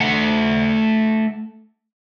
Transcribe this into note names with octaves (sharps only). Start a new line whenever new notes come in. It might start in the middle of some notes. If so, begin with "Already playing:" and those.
A3 F#5